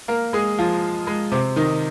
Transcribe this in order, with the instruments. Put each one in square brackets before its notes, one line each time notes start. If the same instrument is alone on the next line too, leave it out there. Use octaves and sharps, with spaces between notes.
[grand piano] A#3 A#4
G#3 G#4
F3 F4
G#3
C3 C4
D#3 D#4